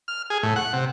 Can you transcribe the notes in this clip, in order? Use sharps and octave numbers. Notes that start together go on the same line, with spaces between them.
F6
G#4
A2
F#5
C3